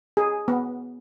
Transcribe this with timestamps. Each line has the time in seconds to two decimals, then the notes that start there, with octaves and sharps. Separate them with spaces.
0.17 G#4
0.48 B3